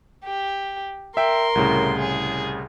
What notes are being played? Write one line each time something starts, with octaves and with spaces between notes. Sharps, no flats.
G4
A#4 E5 G5 C6
C2 A2 C#3
G#4